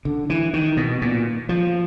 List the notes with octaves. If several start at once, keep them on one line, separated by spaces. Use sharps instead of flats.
D3
E3
D#3
B2
A#2
F3